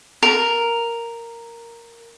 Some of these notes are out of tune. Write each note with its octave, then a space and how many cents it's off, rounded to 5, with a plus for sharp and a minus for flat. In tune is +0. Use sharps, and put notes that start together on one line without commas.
A#4 -5